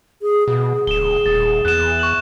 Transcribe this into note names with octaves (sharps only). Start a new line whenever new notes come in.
G#4
B2 G#4
D1 E7 G7
D#1 A6
E2 F#6 E7
C#6 F#6 F#7